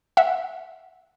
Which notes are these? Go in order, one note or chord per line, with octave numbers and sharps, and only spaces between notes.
E5 F#5